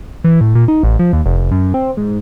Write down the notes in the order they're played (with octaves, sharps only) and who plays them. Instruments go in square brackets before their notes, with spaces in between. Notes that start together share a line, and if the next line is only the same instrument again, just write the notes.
[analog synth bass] E3
A2
A#2
D#4
A1
F3
D#2
F1
F1
F#2
C4
G#2